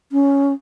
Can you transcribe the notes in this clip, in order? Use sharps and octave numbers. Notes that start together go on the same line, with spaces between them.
C#4